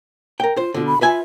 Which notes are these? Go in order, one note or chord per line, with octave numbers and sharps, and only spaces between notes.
A#4 G5
F4 C5
B2 D3 F4
B5
F4 B4 E5 G#5